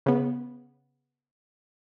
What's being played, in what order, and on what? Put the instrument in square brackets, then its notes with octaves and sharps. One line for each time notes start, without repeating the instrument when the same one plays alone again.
[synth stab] C#3 B3